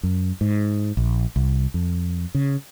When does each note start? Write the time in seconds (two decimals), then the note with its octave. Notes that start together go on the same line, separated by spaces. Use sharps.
0.03 F#2
0.41 G#2
0.97 A#1
1.36 C2
1.74 F2
2.35 C#3